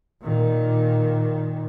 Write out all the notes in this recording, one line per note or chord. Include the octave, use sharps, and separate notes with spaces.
A#2 D#3